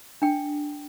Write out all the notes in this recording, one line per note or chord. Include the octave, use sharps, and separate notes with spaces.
D4 G5